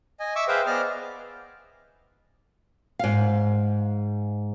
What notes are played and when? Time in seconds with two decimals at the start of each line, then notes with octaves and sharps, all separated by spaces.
0.20 D#5 G#5
0.36 E5 C#6 D6 E6
0.48 G#4 B4 C5 E5 F5 G5
0.66 B3 G#4 D5 D#5 D6 F6
2.99 G#2 F5